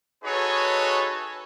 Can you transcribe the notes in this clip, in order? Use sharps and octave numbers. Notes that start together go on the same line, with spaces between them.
D#4 F#4 G#4 A4 B4 C#5